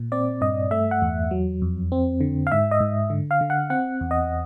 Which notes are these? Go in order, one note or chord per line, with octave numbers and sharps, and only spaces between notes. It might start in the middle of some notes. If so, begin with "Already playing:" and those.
Already playing: A#2
C4 D5
G2 D#5
A3 E5
F#5
E2
F#3
F2
C4
D3
F5
G#2 E5
D#5
G#2
D3
F5
D3
F#5
C4 F#5
E2
D#5